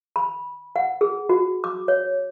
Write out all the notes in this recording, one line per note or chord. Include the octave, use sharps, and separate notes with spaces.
B5
F#5
G#4
F#4
D6
C#5